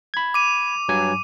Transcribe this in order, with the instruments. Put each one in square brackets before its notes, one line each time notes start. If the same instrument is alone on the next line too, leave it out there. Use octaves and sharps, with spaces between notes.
[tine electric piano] B5 G#6
[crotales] D6 D#7
[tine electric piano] G2 F#3 G#5